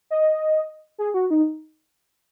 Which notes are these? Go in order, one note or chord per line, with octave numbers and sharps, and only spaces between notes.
D#5
G#4
F#4
D#4